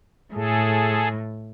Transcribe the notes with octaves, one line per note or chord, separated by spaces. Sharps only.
A2 G#4 A4